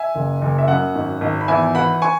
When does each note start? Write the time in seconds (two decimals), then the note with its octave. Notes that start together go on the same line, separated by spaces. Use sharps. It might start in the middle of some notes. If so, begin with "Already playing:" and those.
Already playing: E5 G#5
0.15 F#1
0.42 F#1
0.58 E5
0.68 F#2 F#5
0.95 G#1
1.21 G#1
1.41 B5
1.48 E2 E5 G#5
1.75 E3 F#5 B5
2.02 G#5 C#6